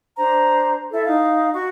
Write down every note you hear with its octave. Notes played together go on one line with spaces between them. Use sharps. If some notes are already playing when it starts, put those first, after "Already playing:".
D4 C5 A#5
E4 A4 E5
D#4 F5
F#4 C#6